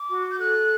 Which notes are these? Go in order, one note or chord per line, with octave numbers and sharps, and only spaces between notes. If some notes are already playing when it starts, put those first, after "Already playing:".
Already playing: D6
F#4
G6
A4 F#6